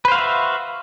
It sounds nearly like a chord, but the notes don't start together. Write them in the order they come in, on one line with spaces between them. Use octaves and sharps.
B4 C5 F5 F#4 E5